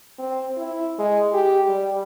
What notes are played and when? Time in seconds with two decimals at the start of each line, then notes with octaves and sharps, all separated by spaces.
0.19 C4
0.57 E4
0.98 G#3
1.33 G4
1.69 G3